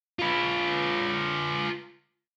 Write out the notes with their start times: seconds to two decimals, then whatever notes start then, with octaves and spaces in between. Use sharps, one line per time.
0.19 F4 B4